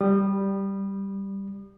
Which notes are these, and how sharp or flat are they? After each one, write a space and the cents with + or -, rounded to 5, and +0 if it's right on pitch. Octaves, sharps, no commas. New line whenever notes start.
G3 +0 D#6 -35